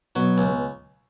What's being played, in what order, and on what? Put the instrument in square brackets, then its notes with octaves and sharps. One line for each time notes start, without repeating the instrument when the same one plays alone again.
[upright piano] B2 B3 [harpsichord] F#3
[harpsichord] C#2
[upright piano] B3